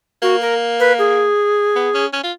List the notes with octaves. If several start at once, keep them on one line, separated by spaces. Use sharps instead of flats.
A#3 F#4
A#4
B4
G#4
B3
C#4
C#4
F4